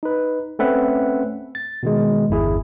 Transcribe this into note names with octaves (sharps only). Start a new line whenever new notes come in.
D#4 B4
A3 C4 C#4 B4 E5 F#5
A6
B2 D#3 G#3
G1 E2 E4 G#4